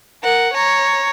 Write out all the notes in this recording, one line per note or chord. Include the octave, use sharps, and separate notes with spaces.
A#4 F#5
C#5 A#5